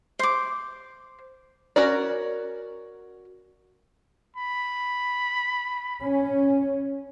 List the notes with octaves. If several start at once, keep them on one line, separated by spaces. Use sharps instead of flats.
C5 D6
C#4 F#4 A#4 D5
B5
C#4